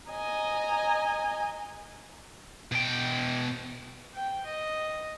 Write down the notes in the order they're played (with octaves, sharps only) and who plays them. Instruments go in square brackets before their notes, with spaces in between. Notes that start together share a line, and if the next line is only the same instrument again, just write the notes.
[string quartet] D#5 G#5 A#5
[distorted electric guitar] B2 G5
[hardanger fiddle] G5
D#5